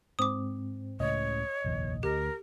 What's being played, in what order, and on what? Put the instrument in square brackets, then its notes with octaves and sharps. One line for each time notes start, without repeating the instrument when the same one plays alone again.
[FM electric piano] G#2 C4 [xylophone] D6 D#6
[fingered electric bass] C#2 A2 C#3 [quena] C#5 [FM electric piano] D#5
[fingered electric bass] F1 A#1 D#2
[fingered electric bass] D2 [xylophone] G4 [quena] A#4